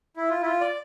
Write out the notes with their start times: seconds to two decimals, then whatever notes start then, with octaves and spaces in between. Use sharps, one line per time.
0.17 E4
0.30 F4
0.41 E4
0.45 F4
0.61 D5